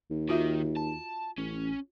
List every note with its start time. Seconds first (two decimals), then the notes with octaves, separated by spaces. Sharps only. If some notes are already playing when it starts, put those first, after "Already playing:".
0.10 D#2
0.29 D#3 F4 F#4 E5
0.76 A5
1.38 A1 C#4